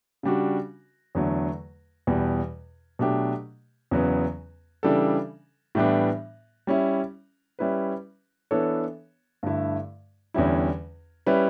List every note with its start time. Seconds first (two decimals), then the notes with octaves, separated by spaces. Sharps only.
0.23 C#3 G3 D4 F#4
1.15 E2 D3 F#3 A3
2.07 E2 B2 G3
2.99 B2 F#3 A3 D4 G4
3.91 E2 C#3 F#3 B3
4.83 C#3 E3 G3 D4 A4
5.75 A2 E3 G3 B3 D4
6.67 G3 C#4 E4
7.59 G3 C#4 E4 B4
8.51 E3 B3 D4 A4 C#5
9.43 G2 D3 A3 E4
10.34 E2 D3 G3 C#4 E4
11.26 G3 C#4 E4 B4